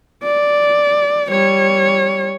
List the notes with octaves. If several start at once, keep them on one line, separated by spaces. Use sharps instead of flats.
D5
G3 C#5